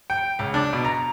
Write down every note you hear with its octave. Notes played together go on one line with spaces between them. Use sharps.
G5
C#2
D4
B2
A#5